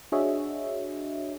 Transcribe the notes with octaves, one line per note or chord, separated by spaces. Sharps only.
D4 F#4 G#4 C#5 D#5 E5